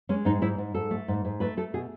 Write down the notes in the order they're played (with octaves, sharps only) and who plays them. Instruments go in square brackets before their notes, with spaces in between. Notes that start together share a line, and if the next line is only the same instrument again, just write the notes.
[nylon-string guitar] G#3 C#4
G#2 D#4
G#2 E4
G#2
G#2 A4
A3
G#2
G#2
A3 B4
A3 A4
B2 G#4